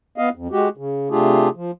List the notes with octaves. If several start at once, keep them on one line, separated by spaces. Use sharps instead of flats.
B3 D#5 F5
F2
G#3 F#4 G4
C#3
C3 A3 D4 F4 G4 G#4
F3